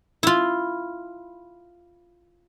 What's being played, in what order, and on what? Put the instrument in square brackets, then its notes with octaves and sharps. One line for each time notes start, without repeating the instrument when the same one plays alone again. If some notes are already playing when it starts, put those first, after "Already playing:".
[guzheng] E4 F4